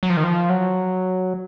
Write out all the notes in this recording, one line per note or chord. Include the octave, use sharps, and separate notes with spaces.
F#3
F3
D#3
F3
F#3